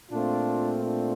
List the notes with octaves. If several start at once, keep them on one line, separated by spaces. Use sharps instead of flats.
A#2 A3 C4 D4 F4
D4 F4